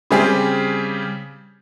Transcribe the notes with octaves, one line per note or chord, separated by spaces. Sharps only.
C#3 G3 C4 G4 G#4